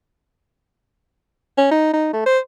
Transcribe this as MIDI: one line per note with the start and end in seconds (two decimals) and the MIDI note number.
1.57 1.68 61
1.71 1.92 63
1.93 2.10 63
2.13 2.25 57
2.26 2.39 72